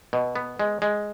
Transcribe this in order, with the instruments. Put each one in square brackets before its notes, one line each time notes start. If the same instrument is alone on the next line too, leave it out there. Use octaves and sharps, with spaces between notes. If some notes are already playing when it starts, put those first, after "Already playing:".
[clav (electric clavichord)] B2
B3
G#3
G#3